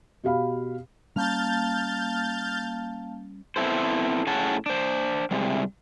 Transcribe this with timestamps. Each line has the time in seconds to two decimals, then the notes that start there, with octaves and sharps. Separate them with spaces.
0.24 B2 G4 F5 B5
1.16 G3 A#3 C#4 F5 A5 F6 G6 A6
3.56 B3 C4 E4 A4 C5
4.27 A2 C#4 G#4 F#5 A5
4.66 D4 C5
5.31 C3 G3 G#3